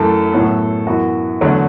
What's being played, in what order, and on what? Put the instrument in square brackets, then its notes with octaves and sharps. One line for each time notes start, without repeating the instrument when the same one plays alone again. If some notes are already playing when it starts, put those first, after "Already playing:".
Already playing: [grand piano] F#2 E3 A3 A4
A2 F#3 B3
F#2 E3 B3 F#4
E2 D3 F#3 A3